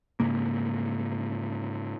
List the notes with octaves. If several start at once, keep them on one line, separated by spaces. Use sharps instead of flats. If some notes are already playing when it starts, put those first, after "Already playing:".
G#2 C#3 A#3